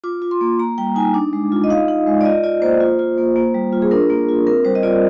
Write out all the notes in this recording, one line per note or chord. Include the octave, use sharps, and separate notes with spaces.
F4 D6
F4
C6
A#3
A#3 A#5
G3 G5
D#4 G#5
D4 D6
G#3
F4
D#5
D#4 F5
D#4
G#3
D5
F4 D#5
F4 D5
A#3 C5
F4
F4
A#3
A#3
G3
F4
G#4
D4 A#4
A#3
F4
C4 A#4
G3 C5
D#5
F4 D5